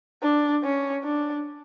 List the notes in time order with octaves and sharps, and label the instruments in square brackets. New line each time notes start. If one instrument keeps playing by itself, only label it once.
[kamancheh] D4
C#4
D4